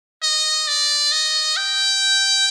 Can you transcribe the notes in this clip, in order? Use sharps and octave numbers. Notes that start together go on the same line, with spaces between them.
D#5
D5
D#5
G5